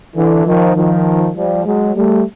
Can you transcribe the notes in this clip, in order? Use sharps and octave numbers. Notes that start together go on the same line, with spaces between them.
D3 E3
D#3 F3
D#3 F3
F3 G3
F#3 G#3
G3 A3